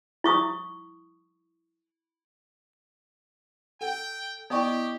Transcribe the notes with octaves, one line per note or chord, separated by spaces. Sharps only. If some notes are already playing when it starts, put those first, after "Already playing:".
E4 C#6 D#6
A4 F#5 G5
B3 E4 G4 D5 D#5 G5 C#6 D#6